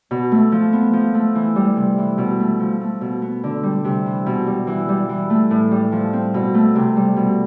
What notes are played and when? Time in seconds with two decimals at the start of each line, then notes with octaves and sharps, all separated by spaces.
0.11 B2
0.32 A3
0.52 F3
0.73 B3
0.93 F3
1.15 A3
1.35 E3
1.56 G3
1.77 C3
1.98 E3
2.18 B2
2.40 A3
2.60 F3
2.81 A3
3.01 B2
3.22 B3
3.43 D3
3.63 G3
3.84 C3
4.06 E3
4.26 B2
4.47 G3
4.67 E3
4.89 G3
5.09 E3
5.30 A3
5.51 A2
5.71 G3
5.92 F3
6.13 C4
6.34 B2
6.54 A3
6.75 C3
6.97 G3
7.16 B2